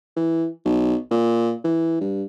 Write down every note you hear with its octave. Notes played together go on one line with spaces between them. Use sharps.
E3
B1
A#2
E3
G2